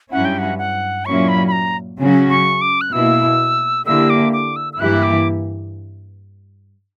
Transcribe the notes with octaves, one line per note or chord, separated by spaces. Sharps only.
G2 F#3 C#4 E4 F#5
G5
F#5
F#5
A#2 F#3 A#3 C#4 E4 C#6
B5
B5
A#5
C#3 F#3 C#4 F#4
C#6
D6
F#6
B2 A#3 E4 E6
D3 A#3 E4 G4 E6
D6
D6
E6
E6
G2 E3 A#3 E4 G4 F#6
D6